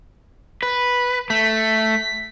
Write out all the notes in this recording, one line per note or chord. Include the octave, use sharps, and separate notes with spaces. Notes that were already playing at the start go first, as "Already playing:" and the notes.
B4
A3 B6